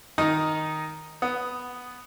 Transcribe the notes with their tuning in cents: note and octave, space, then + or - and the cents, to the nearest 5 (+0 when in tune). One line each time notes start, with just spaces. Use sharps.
D#3 +0 D#4 +0 D#6 +0
B3 +0 D#6 +0